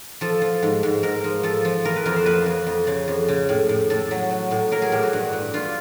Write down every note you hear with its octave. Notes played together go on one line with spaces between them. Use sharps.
F3 A4
F3
G#2
G#2
G#2 A#4
F3
F3 A4
F3
E3 A#4
B4
F2 A#4
C5
F2 B4
F2
F2
C#3
F2
C#3
A2
A2
A2 A4
F#3
F#3
A2
F#3 A#4
G#4
A2 G4
F#4
G2
G2
G2 F4